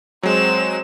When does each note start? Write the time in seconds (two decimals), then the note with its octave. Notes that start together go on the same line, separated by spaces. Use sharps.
0.23 F#3 G#3 C4 E7